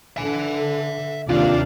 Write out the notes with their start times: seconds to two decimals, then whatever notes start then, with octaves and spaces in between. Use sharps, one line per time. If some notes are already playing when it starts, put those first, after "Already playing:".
0.17 D3 E5 G#5
1.29 D#2 C3 D4 F4 D5 F5